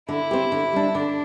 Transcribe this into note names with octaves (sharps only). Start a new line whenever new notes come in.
D3 E4
C4 G4
D3
G3 D4
D3 D4